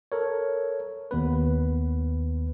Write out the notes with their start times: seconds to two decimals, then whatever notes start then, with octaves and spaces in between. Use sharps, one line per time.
0.12 A4 A#4 C#5
1.11 D#2 B3 B4